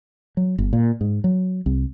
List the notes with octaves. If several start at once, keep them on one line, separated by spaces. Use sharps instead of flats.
F#3
G1
A#2
G#2
F#3
C2